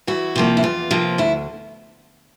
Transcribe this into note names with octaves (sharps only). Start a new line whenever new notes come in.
E2 E4 F#4
C3 F3 A#3
E4
E2 F4
C3 F3 A#3
D2 E4